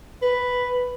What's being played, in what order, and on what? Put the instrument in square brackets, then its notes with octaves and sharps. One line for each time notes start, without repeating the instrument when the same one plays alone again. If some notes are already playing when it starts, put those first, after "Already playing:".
[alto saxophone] B4